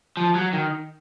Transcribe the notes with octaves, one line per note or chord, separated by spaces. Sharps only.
F3
F#3
D#3